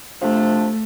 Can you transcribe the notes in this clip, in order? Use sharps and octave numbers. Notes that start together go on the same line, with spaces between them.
C3 F3 A3 D4